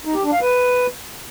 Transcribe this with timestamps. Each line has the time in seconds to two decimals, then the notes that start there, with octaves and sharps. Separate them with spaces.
0.05 D#4
0.14 G4
0.23 D4
0.32 F5
0.41 B4